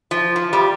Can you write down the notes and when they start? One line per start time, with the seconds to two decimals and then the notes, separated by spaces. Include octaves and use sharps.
0.11 F3
0.36 F3
0.53 G3